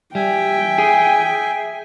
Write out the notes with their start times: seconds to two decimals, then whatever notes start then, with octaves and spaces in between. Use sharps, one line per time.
0.15 G3 E5 G5 G#5
0.78 G#4